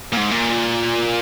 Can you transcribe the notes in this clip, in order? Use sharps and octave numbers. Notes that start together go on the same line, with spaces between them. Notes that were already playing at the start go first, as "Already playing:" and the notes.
A#2
G#2
A#2